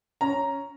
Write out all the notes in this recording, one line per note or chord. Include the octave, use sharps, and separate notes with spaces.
C#4 A#5